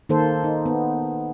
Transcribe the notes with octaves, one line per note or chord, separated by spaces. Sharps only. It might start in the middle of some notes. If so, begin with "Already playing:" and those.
D#3 A#3 A4 C5
D#4
B3